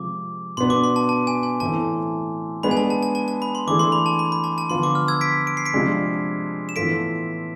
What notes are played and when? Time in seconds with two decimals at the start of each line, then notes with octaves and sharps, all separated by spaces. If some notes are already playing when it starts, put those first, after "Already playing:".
Already playing: C3 F3 G#3 D6
0.57 B2 B3 D4 C6
0.70 D6
0.84 C6
0.96 A5
1.09 A5
1.27 G#5
1.43 G#5
1.60 A2 E3 A3 C4 E4 A5
2.63 G#3 B3 D4 G#4 B5
2.71 G#5
2.77 A5
2.90 A5
3.03 A5
3.15 A5
3.28 A5
3.42 B5
3.55 C6
3.67 E3 A3 D4 G#4 D6
3.79 C6
3.92 B5
4.06 A5
4.19 B5
4.32 B5
4.44 A5
4.58 A5
4.70 D3 F3 B3 F4 C6
4.83 D6
4.95 F6
5.08 E6 G#6
5.21 B6 D7
5.47 D7
5.57 C7
5.66 B6 D7
5.74 C3 F3 G#3 D4
6.69 E7
6.76 A2 E3 B3 F4 A4 B6 D7